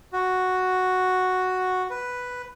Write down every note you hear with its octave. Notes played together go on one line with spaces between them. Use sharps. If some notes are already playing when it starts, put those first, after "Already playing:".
F#4
B4